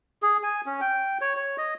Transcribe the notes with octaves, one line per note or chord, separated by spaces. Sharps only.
G#4
G#5
C#4
G5
C#5
C#5
D#5